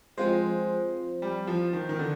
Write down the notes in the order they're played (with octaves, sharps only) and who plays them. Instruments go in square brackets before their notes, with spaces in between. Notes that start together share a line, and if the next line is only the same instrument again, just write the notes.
[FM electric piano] F3 C4 F4 C5 [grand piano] G#3
[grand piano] G3
F3
D#3
D#3
D3